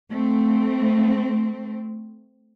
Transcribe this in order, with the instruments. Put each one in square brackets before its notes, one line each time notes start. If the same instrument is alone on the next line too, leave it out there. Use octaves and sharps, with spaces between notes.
[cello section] A3 C4